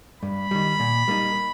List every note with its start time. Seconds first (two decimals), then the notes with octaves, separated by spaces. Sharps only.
0.22 G2 B5
0.51 D#3 G3
0.80 A#2
1.08 G3 A#3 D#4